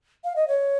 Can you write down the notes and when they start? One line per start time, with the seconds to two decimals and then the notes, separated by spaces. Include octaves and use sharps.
0.24 F5
0.36 D#5
0.48 C#5